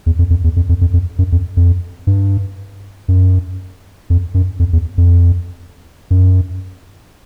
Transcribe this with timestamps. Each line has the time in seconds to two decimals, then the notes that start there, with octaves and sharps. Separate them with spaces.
0.06 E2
0.19 F2
0.30 F2
0.44 E2
0.56 F2
0.69 F2
0.81 F2
0.94 F2
1.19 F#2
1.32 F2
1.57 F2
2.07 G2
3.08 F#2
4.10 F2
4.34 F#2
4.59 F2
4.73 E2
4.98 F2
6.11 F#2